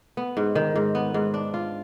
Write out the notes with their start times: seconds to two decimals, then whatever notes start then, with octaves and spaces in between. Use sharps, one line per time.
0.17 B3
0.37 G#2
0.55 D#3
0.76 G#2
0.95 B3
1.14 G#2
1.34 D4
1.54 F4